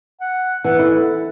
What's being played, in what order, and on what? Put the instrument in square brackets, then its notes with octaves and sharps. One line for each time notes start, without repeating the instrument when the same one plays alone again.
[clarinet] F#5
[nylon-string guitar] E3 [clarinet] F#5
[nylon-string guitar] E4 [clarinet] A4